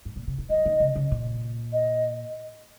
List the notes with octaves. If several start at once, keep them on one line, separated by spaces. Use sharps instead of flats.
G#2
A#2
C#3
D#3
F#3 D#5
D#3
C#3
C#3
A#2
D#5